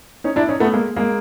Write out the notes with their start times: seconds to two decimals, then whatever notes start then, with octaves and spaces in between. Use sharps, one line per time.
0.24 C#4 D#4
0.36 D4 E4
0.49 C#4 D#4
0.60 A3 B3
0.73 G#3 A#3
0.96 G#3 A#3